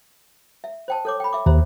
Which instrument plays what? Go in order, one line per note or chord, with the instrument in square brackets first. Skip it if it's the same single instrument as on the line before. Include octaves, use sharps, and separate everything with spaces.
[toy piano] E5
C5 G5 A5
A4 C#5 D6
G5 B5
E5 D6
[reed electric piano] D#2 [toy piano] C5 E5 A#5